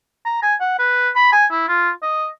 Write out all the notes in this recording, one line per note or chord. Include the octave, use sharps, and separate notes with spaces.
A#5
G#5
F#5
B4
B5
G#5
E4
F4
D#5